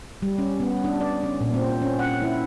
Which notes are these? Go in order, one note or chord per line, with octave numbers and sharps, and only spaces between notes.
G3
C#4
B3
D4
D5
C#4
A#2
C4
C#4
F#5
E4